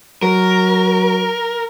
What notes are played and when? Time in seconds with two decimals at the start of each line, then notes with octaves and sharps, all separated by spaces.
0.22 F#3 A#4